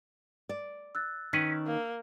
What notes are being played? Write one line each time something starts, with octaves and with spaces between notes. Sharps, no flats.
D5
E6 F#6 A6
D#3 C#4 B4
A#3